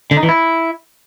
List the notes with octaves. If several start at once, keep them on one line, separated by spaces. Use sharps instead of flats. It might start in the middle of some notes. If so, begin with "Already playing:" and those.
D3
D#4
E3
E4